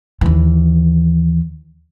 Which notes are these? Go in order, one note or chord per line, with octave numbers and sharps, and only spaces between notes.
D#2 E3